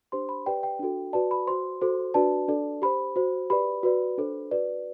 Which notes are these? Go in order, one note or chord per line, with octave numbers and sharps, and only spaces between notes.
D4 G4 C5 C6
B5
G4 B4 D5 G5
G5
D4 F#4 A4
F#4 B4 D5 A5
B5
F#4 C5 C6
F#4 A4 C5
D4 F#4 B4 D5 A5
D4 A4 D5
G4 C5 B5
F#4 C5
G4 B4 D5 B5
F#4 B4 D5
D4 A4 C5
F#4 B4 D5